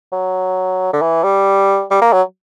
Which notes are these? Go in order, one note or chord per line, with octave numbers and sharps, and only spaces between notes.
F#3
D3
E3
G3
G3
A#3
F#3